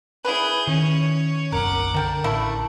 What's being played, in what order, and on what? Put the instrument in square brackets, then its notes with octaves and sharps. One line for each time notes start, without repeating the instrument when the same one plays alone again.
[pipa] E4 B4 [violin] G#4 G6
[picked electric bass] D#3 [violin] C#4 C#5
[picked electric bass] F#1 B1 [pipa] A#4 [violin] F#5 D6
[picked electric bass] D3 [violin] D4 [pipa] A#4 G5
[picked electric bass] A1 [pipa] A3 A#3 E4